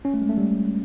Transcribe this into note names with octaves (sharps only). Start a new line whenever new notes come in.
C#4
A3
G#3
A3
G3